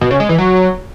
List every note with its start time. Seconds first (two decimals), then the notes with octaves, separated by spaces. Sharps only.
0.01 B2
0.11 C#3
0.20 G#3
0.29 E3
0.38 F#3